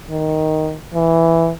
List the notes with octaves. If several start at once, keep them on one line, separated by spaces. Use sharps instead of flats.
D#3
E3